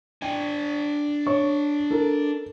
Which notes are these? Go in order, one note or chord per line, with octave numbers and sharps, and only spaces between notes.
D4 G5 G#5
C#5 C#6
A4 A#4